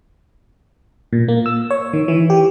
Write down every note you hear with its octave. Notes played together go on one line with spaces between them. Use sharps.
A#2
A#3
E6
C#5
D#3
E3
G4